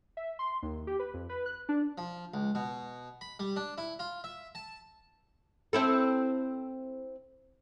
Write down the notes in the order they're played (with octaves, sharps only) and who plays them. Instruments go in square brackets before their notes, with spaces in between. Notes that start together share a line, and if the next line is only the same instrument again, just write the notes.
[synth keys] E5
C6
D#2
G4
B4
F2
B4
F#6
D4
[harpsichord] F3
C#2
B2
B5
G3
D4
E4
F4
E5
A5
[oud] C4 E4 A4